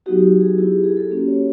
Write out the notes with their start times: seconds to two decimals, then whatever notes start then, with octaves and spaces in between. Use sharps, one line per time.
0.06 F#3 B3 D#4 F#4 G4
0.23 G4
0.41 G#4
0.58 B3 E4 G4
0.72 G#4
0.84 G#4
0.97 A4
1.10 A#3 C#4 F#4 G4
1.28 C#5